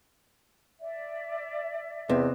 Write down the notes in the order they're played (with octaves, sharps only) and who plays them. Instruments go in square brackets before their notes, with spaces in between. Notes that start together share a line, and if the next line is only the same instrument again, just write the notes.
[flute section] D5 E5
[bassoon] E2 [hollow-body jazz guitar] C3 [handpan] B3 B4 D#5